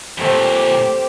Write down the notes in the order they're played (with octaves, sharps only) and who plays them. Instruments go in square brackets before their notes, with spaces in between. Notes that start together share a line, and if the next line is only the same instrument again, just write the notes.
[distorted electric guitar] F2 A#2 [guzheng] G3 A3 C4 [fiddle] G4 C5